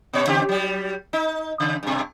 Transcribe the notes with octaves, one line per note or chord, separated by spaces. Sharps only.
A#2 C#5
C#3 C4 G4
F#3 G3
D#4
C#3
G2 B2